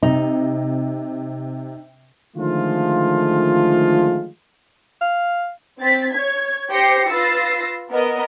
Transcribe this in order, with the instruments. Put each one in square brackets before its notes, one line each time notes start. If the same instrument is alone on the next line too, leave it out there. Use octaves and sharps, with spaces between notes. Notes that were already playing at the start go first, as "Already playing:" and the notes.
[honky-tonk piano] C3 [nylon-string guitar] D#4
[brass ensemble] D3 D#3 F3 G#3 A3 F4
[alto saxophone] F5
[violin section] C4 A6 B6
C#5 G#6
G4 C5 G5 A#6 C7 C#7
F4 B4 E6 A6 A#6 C7
B3 A#4 D#5